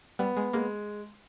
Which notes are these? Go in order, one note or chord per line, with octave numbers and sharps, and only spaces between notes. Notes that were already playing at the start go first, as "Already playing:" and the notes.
G3 B3
G#3
G#3 A#3